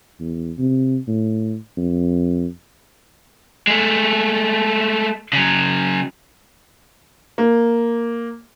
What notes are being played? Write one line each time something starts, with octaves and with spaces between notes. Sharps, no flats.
E2
C3
A2
F2
G#3 A3
C#3 F#3
A#3